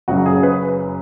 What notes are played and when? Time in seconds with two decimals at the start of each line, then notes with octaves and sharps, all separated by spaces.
0.08 F#1 F#2 C#3 F#4
0.26 G#4
0.43 B4